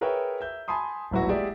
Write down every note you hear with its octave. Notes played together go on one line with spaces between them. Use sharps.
G#4 A#4 B4 C#5 E5 G5
E5 G6
G#5 A5 B5 C6 D#6
D#1 A1 F#3 E4 F#4
G#3 G4 G#4 D5 E5 F#5